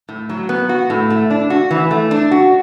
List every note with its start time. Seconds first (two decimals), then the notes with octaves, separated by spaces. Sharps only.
0.09 A2
0.29 F#3
0.49 B3
0.69 F#4
0.90 A2
1.10 A3
1.30 D4
1.50 F#4
1.71 E3
1.91 A3
2.11 D4
2.31 F#4